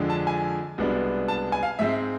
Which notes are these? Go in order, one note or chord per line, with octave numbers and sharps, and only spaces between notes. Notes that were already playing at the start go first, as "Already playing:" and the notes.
Already playing: F2 D3 G#3 D4
A5
G#5
C2 B2 G#3 B3 D4
A5
G#5
F5
G#2 G#3 C4 E5